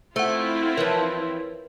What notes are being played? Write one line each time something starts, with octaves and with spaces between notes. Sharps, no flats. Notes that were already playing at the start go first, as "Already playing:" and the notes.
A3 C4 E4 F4 C5 F#5
E3 F3 A#4 B4 C#5